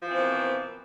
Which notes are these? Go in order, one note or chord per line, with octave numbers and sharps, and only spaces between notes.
B2 E3 F3 A#3 C4